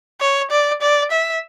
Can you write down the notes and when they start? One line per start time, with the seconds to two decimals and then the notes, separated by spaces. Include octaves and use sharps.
0.21 C#5
0.51 D5
0.82 D5
1.12 E5